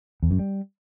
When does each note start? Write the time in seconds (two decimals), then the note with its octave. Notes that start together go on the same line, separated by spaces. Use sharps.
0.23 E2
0.31 F#2
0.39 G3